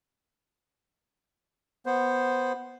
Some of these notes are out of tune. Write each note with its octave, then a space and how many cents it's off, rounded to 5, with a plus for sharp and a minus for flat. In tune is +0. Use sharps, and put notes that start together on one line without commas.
B3 +0 C5 +0